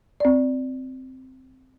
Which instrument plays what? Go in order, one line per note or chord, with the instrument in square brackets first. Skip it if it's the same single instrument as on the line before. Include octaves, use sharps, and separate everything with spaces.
[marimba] C4 D5